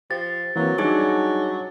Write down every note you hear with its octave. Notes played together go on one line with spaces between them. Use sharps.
F3 G4 A6
E3 F#3 A#3 C4
F#3 G3 D4 D#4 G#4 D6